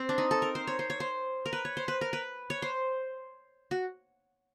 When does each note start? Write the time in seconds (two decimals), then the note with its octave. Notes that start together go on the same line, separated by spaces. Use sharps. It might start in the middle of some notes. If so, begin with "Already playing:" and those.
Already playing: C4
0.09 D4
0.18 D#4
0.31 A4
0.42 A#4
0.55 C5
0.67 C#5
0.79 C5
0.90 C#5
1.00 C5
1.46 A#4
1.53 B4
1.65 C#5
1.77 C5
1.88 B4
2.01 A#4
2.13 B4
2.50 C#5
2.62 C5
3.71 F#4